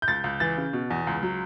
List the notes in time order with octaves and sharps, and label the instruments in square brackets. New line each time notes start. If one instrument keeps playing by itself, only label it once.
[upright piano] G6
C#2 A6
C#2
E3 A6
C#3
B2
E2
C#2
F#3